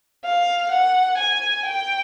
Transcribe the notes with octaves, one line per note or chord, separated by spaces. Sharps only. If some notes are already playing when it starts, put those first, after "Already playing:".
F5
F#5
G#5
G5